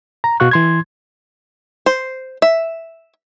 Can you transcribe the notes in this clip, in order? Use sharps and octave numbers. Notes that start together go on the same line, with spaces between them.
A#5
B2 F#4 F5 C#6 F#6
E3 C6 G#6
C5
E5